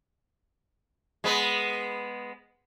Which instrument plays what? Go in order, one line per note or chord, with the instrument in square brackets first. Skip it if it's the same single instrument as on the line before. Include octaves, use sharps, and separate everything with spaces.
[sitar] G#3 B3 B4